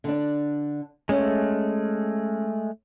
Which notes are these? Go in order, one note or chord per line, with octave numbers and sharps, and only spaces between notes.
D3 D4
G#3 A3 C#4